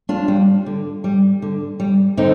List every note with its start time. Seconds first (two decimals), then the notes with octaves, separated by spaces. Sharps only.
0.09 D4 F4
0.28 G3
0.66 D3
1.04 G3
1.42 D3
1.80 G3
2.17 D3 C4 D#4